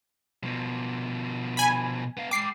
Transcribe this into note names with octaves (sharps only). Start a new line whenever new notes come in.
B2 F3
G#5 B5
B3 F5
G#3 G5 D6 C7